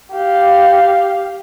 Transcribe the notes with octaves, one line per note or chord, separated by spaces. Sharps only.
G4 F5